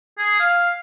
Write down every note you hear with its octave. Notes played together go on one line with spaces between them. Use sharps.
G#4
F5